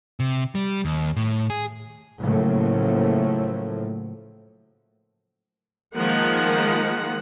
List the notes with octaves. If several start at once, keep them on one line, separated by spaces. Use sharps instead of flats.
C3
G3
D#2
A2
G#4
A2 C#3 F3 F#3 A3 A#3
D#3 F3 G#3 A#3 F#5